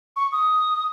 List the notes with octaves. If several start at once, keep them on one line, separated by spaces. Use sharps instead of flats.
C#6
D#6